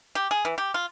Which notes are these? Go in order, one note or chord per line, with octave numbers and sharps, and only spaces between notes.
G4
G#4
E3
G4
F4